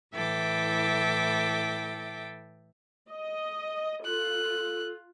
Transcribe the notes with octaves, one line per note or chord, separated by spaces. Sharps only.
A2 E3 A4 E5 G5 D6
D#5
F4 A4 F#6